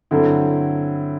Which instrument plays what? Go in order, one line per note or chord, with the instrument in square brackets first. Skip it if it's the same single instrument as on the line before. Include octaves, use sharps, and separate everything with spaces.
[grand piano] G2 F#3 C4 E4 [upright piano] D3